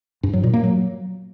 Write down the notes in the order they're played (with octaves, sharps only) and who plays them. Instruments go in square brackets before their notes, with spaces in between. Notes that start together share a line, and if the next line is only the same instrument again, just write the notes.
[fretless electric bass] G2
F#3
A#2
A#3
F#3